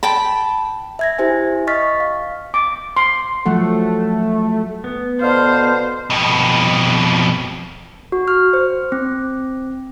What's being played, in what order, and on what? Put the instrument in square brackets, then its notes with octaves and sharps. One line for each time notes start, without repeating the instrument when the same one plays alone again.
[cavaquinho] G5 A5 B5
[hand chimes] E5 G#6 A#6
E4 G4 C5 E5 G#5
D#5 C#6 F6 A6 B6
F5
[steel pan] D6
C6
[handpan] F3 F#3 F#5 [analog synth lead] A3
[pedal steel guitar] B3
[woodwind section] B2 D3 F5 [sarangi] C5
[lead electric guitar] F2 B2
[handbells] F#4
F6
C5
C4